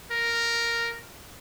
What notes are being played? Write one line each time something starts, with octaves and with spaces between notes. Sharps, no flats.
A#4